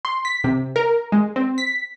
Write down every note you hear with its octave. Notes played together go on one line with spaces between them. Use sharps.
C6
B6
C3
A#4
G#3
C4
B6